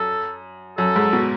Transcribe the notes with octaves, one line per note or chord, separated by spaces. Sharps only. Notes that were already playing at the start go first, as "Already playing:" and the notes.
Already playing: F#2 A4
F#2 A4
G#2
B2